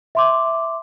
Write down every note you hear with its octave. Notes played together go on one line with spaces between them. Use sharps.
E5 C6 D6